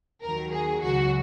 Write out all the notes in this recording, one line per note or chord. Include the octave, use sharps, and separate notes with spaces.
D#2 D#3 F#3 A#4
G#4
C#2 C#3 F#3 F#4